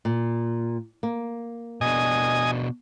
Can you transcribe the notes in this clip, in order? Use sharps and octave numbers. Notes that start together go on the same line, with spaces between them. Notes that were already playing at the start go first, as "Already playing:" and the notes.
A#2
A#3
B2 D4 D#5 G#5